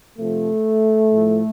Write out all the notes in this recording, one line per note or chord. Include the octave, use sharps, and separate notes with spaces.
C3 F3 A3
A2 F3